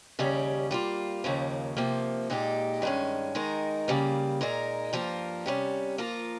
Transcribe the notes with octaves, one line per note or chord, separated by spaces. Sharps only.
D#2 C#3 G3 C#4
G3 A#3 F4
D#2 C#3 F3 A#3
C3 F3 A#3
A#2 G#3 D#4 G4
G2 D#3 G#3 C#4
D#3 G#3 D#4 A#4
C#3 G3 A#3
A#2 G#3 D#4 A#4
G2 F3 A#3 F4 A#4
C3 G3 C#4
F3 A#3 F4 A#4